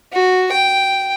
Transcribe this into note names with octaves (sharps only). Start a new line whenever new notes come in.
F#4
G5